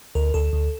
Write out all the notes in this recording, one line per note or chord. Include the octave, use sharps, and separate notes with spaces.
D2 A#4
D2 A4
D2